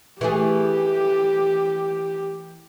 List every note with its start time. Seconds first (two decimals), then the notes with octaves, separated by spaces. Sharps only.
0.21 E3 A3 G4 G#4